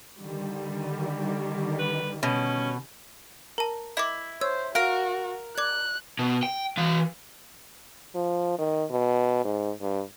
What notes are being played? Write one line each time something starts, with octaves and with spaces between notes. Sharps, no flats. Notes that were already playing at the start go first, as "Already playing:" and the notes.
D3 D#3 G3
B4
B2 C#4
A#4 A5 A#5
E4 D#5 D6
C5 C#5 E6 G#6
F#4 A#4 F5 F6 A#6 D7
D5 D6 F#6 G#6
B2
G5
E3 F5
F3
D#3
B2
G#2
G2